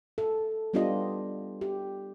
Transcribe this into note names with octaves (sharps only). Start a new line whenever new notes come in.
A4
G3 B3 D4 F4 G4 D#5
G4